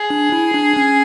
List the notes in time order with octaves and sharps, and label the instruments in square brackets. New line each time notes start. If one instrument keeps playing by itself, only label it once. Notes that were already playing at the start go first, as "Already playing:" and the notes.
Already playing: [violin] G#4
[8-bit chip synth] D4
E4
D4
C#4